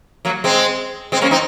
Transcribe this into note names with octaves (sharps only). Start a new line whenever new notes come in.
F#3 A#3
G#3 C4
G#3 C4
A#3 C#4
C4 D#4